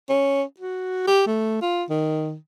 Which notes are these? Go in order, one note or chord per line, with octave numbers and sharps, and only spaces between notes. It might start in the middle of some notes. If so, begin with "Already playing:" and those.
C#4
F#4
G4
A3
F4
D#3